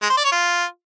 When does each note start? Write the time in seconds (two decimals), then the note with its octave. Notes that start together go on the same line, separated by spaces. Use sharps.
0.03 G#3
0.10 C5
0.17 D5
0.25 C#5
0.32 F4